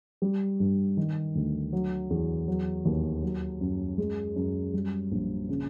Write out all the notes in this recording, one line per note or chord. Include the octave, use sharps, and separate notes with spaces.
G3
G2
D#3
D2
F#3
E2
F#3
D#2
F#3
F#2
G#3
F#2
G3
A#1
C#3